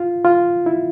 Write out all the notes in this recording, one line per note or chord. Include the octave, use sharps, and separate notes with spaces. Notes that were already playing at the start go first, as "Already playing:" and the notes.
Already playing: F4
F4
E4